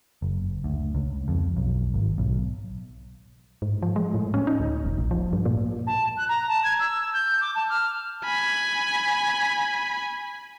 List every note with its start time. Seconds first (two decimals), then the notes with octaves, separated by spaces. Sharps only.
0.22 F#1
0.64 D2
0.95 C#2
1.28 F2
1.57 B1
1.94 G#1
2.18 B1
3.62 G#2
3.82 F3
3.96 G#3
4.14 A2
4.34 C#4
4.47 D#4
4.60 D2
4.85 E1
4.98 A#1
5.11 F3
5.33 G2
5.45 A#2
5.87 A5
6.17 F#6
6.29 A#5
6.49 A5
6.64 G#6
6.79 E6
7.14 G6
7.41 D6
7.55 A5
7.69 F6
8.25 G#5 B5